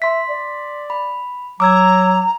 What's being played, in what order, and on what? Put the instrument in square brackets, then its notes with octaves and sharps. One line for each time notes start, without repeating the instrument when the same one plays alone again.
[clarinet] E5 [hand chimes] C6 B6
[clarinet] D5
[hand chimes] B5
[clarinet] F#3 [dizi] A#5 [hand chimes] D6 E6 G#6